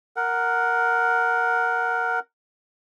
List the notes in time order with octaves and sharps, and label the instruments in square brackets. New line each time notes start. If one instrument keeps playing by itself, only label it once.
[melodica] A#4 F#5